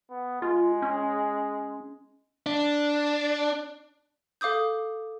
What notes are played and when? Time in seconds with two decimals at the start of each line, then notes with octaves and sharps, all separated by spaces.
0.10 B3
0.42 G#3 F4
0.82 C#4
2.46 D4
4.41 A4 F5 D6 D#6 G6